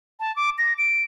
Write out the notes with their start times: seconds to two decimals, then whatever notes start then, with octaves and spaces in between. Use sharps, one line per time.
0.20 A5
0.36 D6
0.58 A#6
0.78 D7